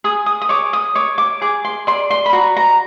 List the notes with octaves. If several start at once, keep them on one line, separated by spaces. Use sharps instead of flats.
G#4 D#6
D#6
D#6
C#5 D6
D#6
C#5 D6
D6
G#4 D6
C6
D5 C6
C6
B5
F#4 A#5
A#5